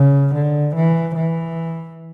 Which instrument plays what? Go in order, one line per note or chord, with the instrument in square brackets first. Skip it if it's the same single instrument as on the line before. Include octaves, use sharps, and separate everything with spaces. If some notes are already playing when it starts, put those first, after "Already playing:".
Already playing: [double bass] C#3
D3
E3
E3